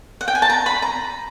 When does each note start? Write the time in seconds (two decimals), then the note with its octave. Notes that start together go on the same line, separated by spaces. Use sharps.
0.21 F#5
0.28 G5
0.35 G#5
0.42 A5
0.50 A#5
0.66 B5
0.82 A#5